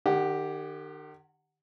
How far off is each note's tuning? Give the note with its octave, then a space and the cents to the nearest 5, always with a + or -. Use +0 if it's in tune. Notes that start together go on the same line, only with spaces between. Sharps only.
D#3 -35 G4 +0 F#5 +0